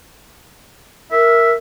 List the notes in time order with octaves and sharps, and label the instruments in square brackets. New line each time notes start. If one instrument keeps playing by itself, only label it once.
[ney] A#4 [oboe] E5